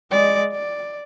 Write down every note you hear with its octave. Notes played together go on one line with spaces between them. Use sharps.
G#3 D5
D5